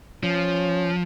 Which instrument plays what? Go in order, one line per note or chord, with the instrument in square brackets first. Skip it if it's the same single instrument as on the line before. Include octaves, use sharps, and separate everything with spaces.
[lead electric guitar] F3 [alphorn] C#4